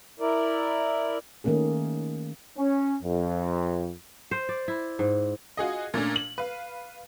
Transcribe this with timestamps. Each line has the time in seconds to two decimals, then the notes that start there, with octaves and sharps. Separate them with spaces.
0.20 E4 A#4 D5
1.44 D#3 A3 A#3 C#4 G#4
2.58 C#4
3.02 F2
4.31 C5
4.49 D5
4.68 E4
4.99 G#2
5.57 F4 F#4 G#4 D#5
5.94 A#2 A3 C#4 D4
6.16 F#7
6.38 B4 F5